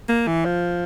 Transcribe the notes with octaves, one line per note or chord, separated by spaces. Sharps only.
A#3
E3
F3